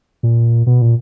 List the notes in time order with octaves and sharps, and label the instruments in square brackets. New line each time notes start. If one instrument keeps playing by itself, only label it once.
[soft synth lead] A#2
B2
A#2